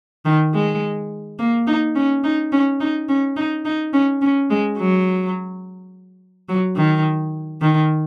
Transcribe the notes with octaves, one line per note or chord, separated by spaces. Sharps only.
D#3
G#3
A#3
D#4
C#4
D#4
C#4
D#4
C#4
D#4
D#4
C#4
C#4
G#3
F#3
F#3
D#3
D#3